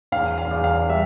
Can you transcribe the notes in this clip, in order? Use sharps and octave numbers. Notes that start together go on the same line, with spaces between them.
E2 F5
F5
E2
F5
G3 E5